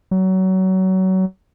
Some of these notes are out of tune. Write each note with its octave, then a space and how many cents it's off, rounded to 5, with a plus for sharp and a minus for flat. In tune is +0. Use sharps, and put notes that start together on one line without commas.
F#3 +25